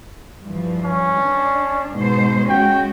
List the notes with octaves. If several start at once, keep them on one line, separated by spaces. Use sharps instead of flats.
G2 E3 F3
C#4
D4
G#2 B2 C5
G#3 C#4 F#4 G5